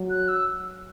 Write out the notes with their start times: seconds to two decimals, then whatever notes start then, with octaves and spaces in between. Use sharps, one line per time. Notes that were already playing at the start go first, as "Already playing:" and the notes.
Already playing: F#3
0.10 F#6
0.28 E6